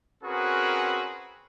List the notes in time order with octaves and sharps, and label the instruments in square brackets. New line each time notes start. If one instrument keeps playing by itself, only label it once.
[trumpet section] C4 C#4 F#4 G#4 A#4 B4